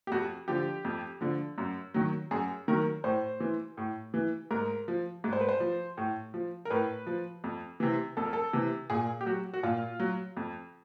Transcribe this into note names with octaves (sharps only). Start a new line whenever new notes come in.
G4
F2 F#4
D3 F3 G4
F2
D3 F3
F#2
D#3 F#3
F#2 G#4
D#3 F#3 A#4
A2 C5
E3
A2
E3
G#2 A#4
F3
G#2
C5
B4
C5
F3
A2
F3
A#4
A2 B4
F3
F2
C3 E3
F2 A4
A#4
A4
C3 E3
A#2 G#4
G4
F#3 F#4
F#4
A#2 F4
F#3
F2